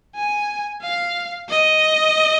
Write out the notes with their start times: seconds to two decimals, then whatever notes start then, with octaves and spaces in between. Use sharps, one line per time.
0.15 G#5
0.82 F5
1.49 D#5